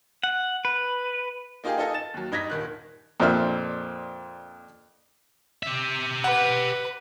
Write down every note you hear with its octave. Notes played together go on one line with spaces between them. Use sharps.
F#5
B4
A#3 D#4 F4 G4 G#4
D#4 F4 A4 D#5 G#5
A6 E7
D#2 F#3
G2 D#4 G#6 A#6 B6
D#1 D#3 F#6
F2 A#2 D4 C5 E5 F6
G4 E5
B4 F#5